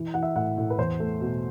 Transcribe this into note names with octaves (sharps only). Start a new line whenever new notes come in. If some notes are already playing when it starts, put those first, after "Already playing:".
Already playing: E3
E3 F#5
E5
A2 F#5
A2
B4
E2 C5
A3
B2